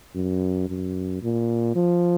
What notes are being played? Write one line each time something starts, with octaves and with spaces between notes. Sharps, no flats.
F#2
F#2
A#2
F3